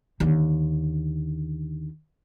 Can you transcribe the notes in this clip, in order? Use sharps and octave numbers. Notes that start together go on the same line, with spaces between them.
D#2 D3